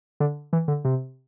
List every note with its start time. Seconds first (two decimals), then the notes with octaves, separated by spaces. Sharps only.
0.20 D3
0.53 E3
0.68 D3
0.85 C3